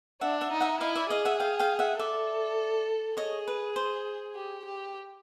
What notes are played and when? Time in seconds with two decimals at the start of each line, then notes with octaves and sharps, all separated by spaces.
0.21 D4 E5 F#5
0.41 E5 F#5
0.52 D#4
0.61 E5 F#5
0.81 E4 D#5 F5
0.96 D5 E5
1.10 G#4 D#5 F5
1.25 E5 F#5
1.40 F5 G5
1.59 F5 G5
1.79 E5 F#5
1.99 A4 D5 E5
3.17 G#4 C#5 D#5
3.48 B4
3.76 C5
4.35 G4
4.65 G4